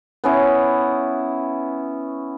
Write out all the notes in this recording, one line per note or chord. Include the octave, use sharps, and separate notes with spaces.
B3 C#4 E4